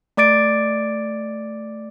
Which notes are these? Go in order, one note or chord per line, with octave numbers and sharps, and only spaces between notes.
A3 D5 D6 A6 D7